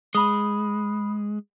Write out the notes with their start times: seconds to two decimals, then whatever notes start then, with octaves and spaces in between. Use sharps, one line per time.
0.15 G#3 B5 D#6